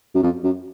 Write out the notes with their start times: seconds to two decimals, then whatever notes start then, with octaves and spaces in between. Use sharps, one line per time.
0.15 F#2
0.23 F2
0.44 F#2